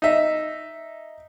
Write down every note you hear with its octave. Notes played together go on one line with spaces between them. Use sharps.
D#4 E5